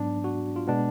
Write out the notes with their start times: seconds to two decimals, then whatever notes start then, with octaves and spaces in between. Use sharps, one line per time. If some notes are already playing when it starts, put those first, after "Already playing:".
Already playing: G#2 F#3 B3 D4
0.24 F#4
0.56 F4
0.68 B2 G#3 B3 D4